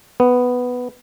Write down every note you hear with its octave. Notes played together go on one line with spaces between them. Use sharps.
B3